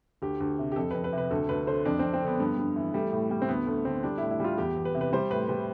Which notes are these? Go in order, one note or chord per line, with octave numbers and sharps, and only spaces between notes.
D2 G4
D2
C3
G4
F2 A4
F2 B4
B4
C3
B4
D2 A4
D2 B4
D3 C5
F2 D4
F2 C4
C4
D3 B3
G2 B3
G2
E3
G3 A3
A2
G3
C4
D2 B3
D2 A3
D3 C4
G3 D4
A2 E4
E4
G3 F4
E2 G4
E2
B4
C3
B4
G3 C5
A2 B4
G3 B4